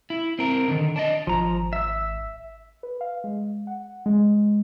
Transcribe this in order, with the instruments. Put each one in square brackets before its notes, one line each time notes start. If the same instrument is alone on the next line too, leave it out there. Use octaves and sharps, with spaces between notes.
[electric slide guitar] E4
C4 A#4
D3 D#3
D4 D5 D#5
[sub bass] G#1 [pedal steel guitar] F3 A#5
[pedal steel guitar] E5 E6
[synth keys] B4
F5
G#3
F#5
G#3